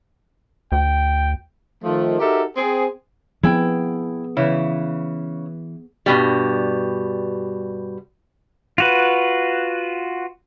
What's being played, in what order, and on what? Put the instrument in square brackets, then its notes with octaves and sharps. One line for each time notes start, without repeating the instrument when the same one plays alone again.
[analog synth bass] D2 [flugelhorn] G5
[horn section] D#3 F3 A3
D#4 F#4 G4 A4 A#4 E5
C4 G#4
[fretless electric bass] F3 C4 [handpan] B3 G#4 [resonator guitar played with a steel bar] E4 G5
[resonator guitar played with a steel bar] C#3 [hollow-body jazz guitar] E3 E4
[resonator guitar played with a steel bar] G2 B2 G3
[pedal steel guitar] F4 F#4 B4